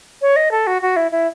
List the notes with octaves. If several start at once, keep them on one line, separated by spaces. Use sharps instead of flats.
C#5
D#5
A4
F#4
F#4
E4
E4